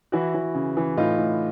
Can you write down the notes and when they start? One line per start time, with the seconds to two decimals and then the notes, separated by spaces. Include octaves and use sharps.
0.12 E3 E4 F#4
0.34 E3
0.54 C#3
0.77 E3
0.97 A2 D#4 F4
1.19 A2